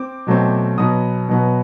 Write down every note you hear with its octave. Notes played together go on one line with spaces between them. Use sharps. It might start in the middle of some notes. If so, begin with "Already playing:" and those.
Already playing: C4 D6
B2 F#3 A3 C4
B2 F#3 B3 D#6
B2 F#3 B3